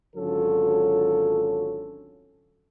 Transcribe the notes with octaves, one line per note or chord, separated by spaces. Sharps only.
G#1 D3 F#3 C#4 F4 A4